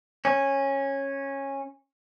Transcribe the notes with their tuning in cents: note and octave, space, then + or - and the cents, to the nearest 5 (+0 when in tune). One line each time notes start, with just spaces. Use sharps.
C#4 -15